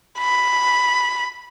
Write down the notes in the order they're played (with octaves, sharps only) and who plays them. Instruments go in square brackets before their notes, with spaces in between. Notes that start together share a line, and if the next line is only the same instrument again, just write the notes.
[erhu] B5